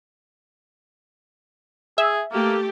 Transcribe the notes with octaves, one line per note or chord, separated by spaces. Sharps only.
G#4 E5
A3 A#3 G4 A4